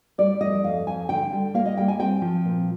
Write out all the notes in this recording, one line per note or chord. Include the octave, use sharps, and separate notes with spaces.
G3 D5
F2 D#5
F2 F5
F2 G#5
D3 G5
G3
A#3 F5
D#5
G3 G5
G#5
C4 G5
F3
A#2